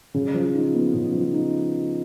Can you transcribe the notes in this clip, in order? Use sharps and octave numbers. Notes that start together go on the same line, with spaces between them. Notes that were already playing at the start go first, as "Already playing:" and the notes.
C#3
F3
D#4
B3
C#3
F3
D#4